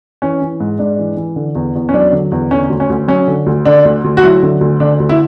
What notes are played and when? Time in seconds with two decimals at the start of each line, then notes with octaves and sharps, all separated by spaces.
0.22 E3 C#4
0.42 E3
0.60 G#2
0.79 G#2 D4
0.99 E3
1.17 E3
1.36 D3
1.55 E2
1.75 E2
1.89 C#4
1.94 F#3 D4
2.12 D3
2.32 E2
2.51 D3 C#4
2.70 D2
2.80 C#4
2.90 D2
3.08 F#3 C#4
3.28 D3
3.46 D2
3.65 D3 D4
3.85 D2
4.04 D2
4.17 F#4
4.23 F#3 E4
4.43 D3
4.61 D2
4.80 D3 D4
5.00 D2
5.09 E4